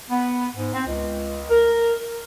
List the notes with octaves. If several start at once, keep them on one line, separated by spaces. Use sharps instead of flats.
B3
G#2
C4
C#2
A#4